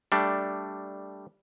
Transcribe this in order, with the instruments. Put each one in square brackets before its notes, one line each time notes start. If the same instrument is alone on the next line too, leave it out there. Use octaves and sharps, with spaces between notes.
[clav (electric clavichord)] G3 A3 D4